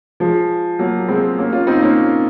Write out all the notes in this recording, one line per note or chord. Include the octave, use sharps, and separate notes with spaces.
F3 G#3
F#3 A#3
G#3 C4
A#3 C#4
C#4 F4
C4 D#4
A#3 C#4